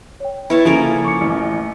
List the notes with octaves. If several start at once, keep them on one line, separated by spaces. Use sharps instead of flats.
C#5 G5
E4 B4 C#5 A5
C#3 F3 A#3 C#4 D#4 A4 A#4
C#6 D6 C#7
A1